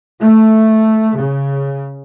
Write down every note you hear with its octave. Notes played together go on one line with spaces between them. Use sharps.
A3
C#3